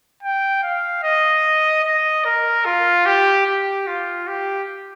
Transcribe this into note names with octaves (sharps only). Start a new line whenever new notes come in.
G5
F5
D#5
D#5
A#4
F4
G4
G4
F4
G4